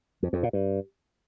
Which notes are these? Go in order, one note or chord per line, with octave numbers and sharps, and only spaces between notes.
F2
F2
A#2
G2